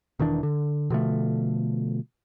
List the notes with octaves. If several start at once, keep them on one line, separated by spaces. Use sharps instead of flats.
E1 D#3 E3 D4
D3
B2 D3 F3 A3